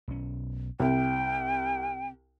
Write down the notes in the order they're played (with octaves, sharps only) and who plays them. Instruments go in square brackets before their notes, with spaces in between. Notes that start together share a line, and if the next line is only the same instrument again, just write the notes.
[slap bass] B1 C#4
[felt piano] C2 [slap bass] C3 [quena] G5